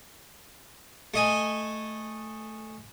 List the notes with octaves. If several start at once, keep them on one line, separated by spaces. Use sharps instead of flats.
A3 D#5 G#5